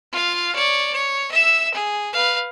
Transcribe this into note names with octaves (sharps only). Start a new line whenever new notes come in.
F4 F5
C#5 D5
C#5
E5 E6
G#4
B4 F5